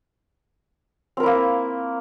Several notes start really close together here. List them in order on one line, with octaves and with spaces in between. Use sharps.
C4 A#4 E4 A#3